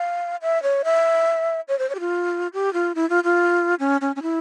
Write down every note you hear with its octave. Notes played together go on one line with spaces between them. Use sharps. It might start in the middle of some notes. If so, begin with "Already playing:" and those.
Already playing: F5
E5
C#5
E5
C#5
C5
C#5
G4
F4
G4
F4
E4
F4
F4
C#4
C#4
C#4
E4